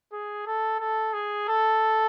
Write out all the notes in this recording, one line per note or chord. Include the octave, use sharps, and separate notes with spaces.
G#4
A4
A4
G#4
A4